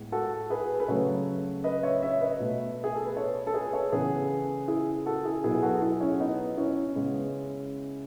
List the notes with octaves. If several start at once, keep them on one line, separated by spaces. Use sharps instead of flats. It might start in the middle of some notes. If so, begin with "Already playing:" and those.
Already playing: A2 G#3 B3
F#4 A4
G#4 B4
B4
C#3 F#3 A3 A4 C#5
B4 D#5
C#5 E5
C#5 E5
B4 D#5
B2 A3
G#4
A4
B4
A4 C#5
A4
G#4 B4
A4 C#5
C#3 E3 B3 G#4 B4
E4 G#4
F#4 A4
E4 G#4
B2 F#3 B3 E4 G#4
F#4 A4
E4 G#4
C#4 E4
B3 D#4
C#4 E4
C#3 G#3 B3